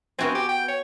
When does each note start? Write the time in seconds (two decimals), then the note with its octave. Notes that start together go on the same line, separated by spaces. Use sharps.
0.19 B3 C4 F#4 G#5
0.35 G4
0.49 G5
0.68 C#5